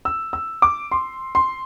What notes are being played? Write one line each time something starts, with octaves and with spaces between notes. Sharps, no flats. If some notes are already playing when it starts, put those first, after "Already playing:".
E6
E6
D6
C6
C6